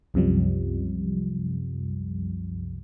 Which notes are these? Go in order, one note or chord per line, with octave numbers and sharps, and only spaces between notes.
C2 F#2 C3 F3 G3